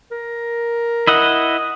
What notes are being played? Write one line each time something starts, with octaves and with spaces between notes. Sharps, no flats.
A#4
E4 D#5 F#5